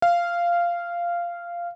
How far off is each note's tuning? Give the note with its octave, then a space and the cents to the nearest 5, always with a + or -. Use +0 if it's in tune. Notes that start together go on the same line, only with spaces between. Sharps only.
F5 -10